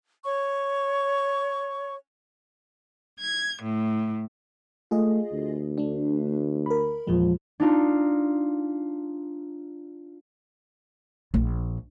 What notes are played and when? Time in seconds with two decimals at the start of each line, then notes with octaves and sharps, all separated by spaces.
0.25 C#5 C#6
3.19 G#6
3.61 A2
4.91 A3 F4 G#4 D#5
5.32 D2
5.78 A3 D4
6.66 A#4 B5
7.07 E2 A#2 F3 G#3
7.60 D4 D#4 F4
11.34 A#1